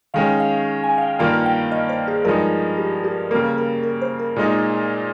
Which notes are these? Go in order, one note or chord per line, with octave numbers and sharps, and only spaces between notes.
D#3 G#3 C#4 F5
F5
G#5
F5
G5
G2 D#3 A#3 F4 F5
G5
D#5
C5
G#4
G2 F3 G#3 D#4 A#4
G4
G4
C#3 G3 A#3 A#4
A#4
A#4
C5
A#4
A#2 G#3 D#4